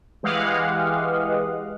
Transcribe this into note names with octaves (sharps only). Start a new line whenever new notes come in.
E3 G#3 G4 D#5 F5 F#5